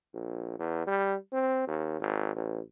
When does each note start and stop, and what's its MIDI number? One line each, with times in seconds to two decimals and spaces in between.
0.14 0.54 34
0.59 0.86 40
0.87 1.15 55
1.33 1.65 60
1.67 1.95 39
2.00 2.32 32
2.36 2.60 33